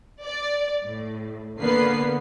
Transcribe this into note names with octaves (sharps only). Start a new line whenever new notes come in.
D5
A2
D3 A#3 B3 B4 C7